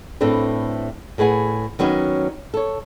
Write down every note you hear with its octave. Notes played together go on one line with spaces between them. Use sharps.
A2 A3 C4 D4 B4
A2 G#4 B4 F#5 G#5
D#3 F#3 B3 C#4 D#4
A4 C#5